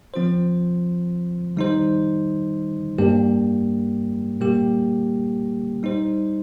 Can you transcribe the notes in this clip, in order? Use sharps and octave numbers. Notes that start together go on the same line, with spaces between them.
F3 C4 F4 C5
D#3 G3 D#4 C5
G2 G3 A#3 G4
A#2 G3 A#3 G4
G3 D#4 C5